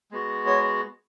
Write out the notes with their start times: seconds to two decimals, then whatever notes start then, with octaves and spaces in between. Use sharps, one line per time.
0.11 G#3 B3 F#4
0.46 C#5